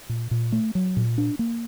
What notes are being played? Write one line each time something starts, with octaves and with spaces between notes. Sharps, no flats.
A#2
A#2
A3
F#3
A#2
D4
A#3